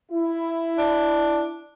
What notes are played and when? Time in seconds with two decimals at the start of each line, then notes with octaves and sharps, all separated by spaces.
0.11 E4
0.78 D4